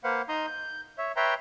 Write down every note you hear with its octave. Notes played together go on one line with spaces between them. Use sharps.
A#3 B4 C5 F5 F#5
D#4 A#5 C6 D#6
G6
C#5 E5
B4 C#5 E5 G5 A#5 C6